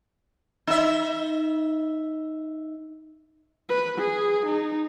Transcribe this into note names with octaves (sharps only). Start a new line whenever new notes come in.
D#4 E5
B4
G#4
D#4